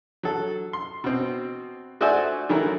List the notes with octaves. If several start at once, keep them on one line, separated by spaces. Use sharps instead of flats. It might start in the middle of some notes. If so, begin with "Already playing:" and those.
F#3 A4
C6
B2 C4
A3 F#4 C5 D5 E5 G#5
D#3 E3 F#3 A3 E4 A#4